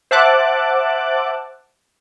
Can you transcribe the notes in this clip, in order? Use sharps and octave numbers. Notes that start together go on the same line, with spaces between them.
C5 E5 F#5 A5 D6 F#6